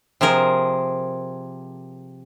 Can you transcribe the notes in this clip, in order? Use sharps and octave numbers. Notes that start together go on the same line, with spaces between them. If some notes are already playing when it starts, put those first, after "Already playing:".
C3 F3 G#4 A#4